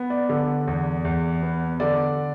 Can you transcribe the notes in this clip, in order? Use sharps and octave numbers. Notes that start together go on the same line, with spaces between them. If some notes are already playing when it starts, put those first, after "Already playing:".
Already playing: B3
D5
D3 D5
E2
E2
B3
D3 D5